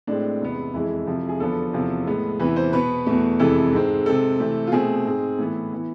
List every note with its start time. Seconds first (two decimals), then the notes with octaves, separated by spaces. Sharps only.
0.07 A2 G#3 C4 D4
0.41 E2 C3 G#3 B3
0.74 F2 E3 G#3 E4
1.06 F2 C3 F3
1.29 G#4
1.40 E2 D3 F3 B3 A4
1.73 E2 C3 F3
2.06 A2 G#3 B3
2.40 E2 C3 E3 B4
2.56 C5
2.73 B2 B3 B4
3.06 E2 B2 A3
3.39 F2 C3 E3 G#3 B3 A4
3.73 G#2 G#3 C4
4.06 C3 G#3 C4 A4
4.40 C3 E3 A3 C4
4.67 F4
4.72 B2 A3 C4 G#4
5.05 G#2 G#3 C4
5.38 A2 E3 B3
5.73 E3 B3